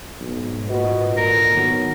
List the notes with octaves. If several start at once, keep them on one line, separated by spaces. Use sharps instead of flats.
B1 G#2
A#2 F#4 B4 D#5
D3 E3 A#4
D#3 F#3 B3 F#4